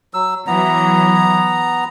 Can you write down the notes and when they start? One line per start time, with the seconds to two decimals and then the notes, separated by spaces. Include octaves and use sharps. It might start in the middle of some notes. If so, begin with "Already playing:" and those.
0.14 F#3 E6
0.47 E3 F#3 B3 A#5